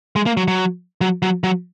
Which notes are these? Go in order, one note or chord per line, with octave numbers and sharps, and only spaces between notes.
G#3
A#3
F#3
F#3
F#3
F#3
F#3